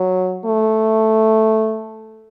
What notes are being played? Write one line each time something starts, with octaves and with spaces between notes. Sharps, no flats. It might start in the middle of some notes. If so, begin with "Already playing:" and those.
Already playing: F#3
A3